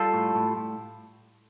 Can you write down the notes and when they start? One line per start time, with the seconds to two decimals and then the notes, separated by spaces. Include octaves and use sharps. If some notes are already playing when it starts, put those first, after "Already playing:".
Already playing: G3 F4 A4
0.14 A2
0.35 A2
0.57 A2